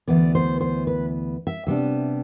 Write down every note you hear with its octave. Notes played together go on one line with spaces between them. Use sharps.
D2 C3 E3 B3 D5
C5
C5
B4
E5
C3 G3 B3 D4 E5